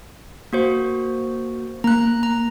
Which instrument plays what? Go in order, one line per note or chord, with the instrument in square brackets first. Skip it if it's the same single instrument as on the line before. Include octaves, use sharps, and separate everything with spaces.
[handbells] A#3 F#4 C5
[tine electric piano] A#3 [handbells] A#5 F#6
[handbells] A#5